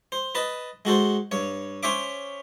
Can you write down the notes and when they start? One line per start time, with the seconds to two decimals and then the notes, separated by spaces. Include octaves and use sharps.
0.12 C5
0.35 B4 D#5 A5
0.85 G#3 F#4 A4 C5
1.31 G2 C#5
1.83 C#4 C5 C#5 E5 D6